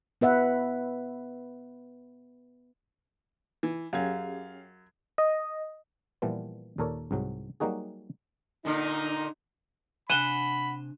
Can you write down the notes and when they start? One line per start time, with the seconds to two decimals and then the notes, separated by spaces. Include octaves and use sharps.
0.21 B3 B4 E5 F#5
3.63 E3
3.93 F#2 C#4 G4 G#4 F5 G#6
5.18 D#5
6.22 A#2 E3 F3 G3 B3
6.78 D#2 A#2 A4 A#4 C#5 D5
7.11 C2 G#2 F#3
7.60 F#3 G3 A#3 D#4 F#4 G#4
8.65 A#2 D3 A#3 D#4
10.10 C3 D4 F#5 G#5 B5 D#7 E7 G7